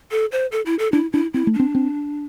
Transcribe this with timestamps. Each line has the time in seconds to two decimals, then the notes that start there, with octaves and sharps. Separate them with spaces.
0.11 A4
0.32 C5
0.52 A4
0.66 E4
0.79 A4
0.92 D4 E4
1.13 D4 E4
1.34 C4 E4
1.47 A3
1.54 D4
1.59 C4
1.75 C4